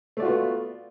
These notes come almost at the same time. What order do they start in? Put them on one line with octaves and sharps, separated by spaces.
A3 D5 F#4 F4 B3